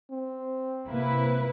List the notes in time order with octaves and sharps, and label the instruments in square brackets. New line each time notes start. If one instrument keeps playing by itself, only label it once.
[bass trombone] C4
[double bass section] C3 A#3 [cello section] E4 B4